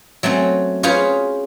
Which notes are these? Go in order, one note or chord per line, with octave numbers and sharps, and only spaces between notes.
F#3 A3 C4 C#4
C#4 F4 G#4 B4 C5